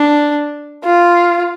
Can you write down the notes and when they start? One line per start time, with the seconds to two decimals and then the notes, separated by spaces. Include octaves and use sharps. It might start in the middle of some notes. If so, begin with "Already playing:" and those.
Already playing: D4
0.84 F4